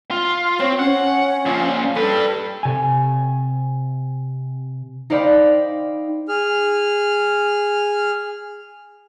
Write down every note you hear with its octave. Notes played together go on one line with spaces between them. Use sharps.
F4
C4 C#5
C#4 F#5
A#2 F3
G3 A4 B4
C3 G#5
D#4 C5 D5 F5 G5 B5
G#4 F6